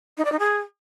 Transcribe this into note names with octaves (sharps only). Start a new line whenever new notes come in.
D#4
D5
D#4
G#4